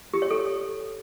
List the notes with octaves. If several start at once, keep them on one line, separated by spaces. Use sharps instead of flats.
G4
C#5
A4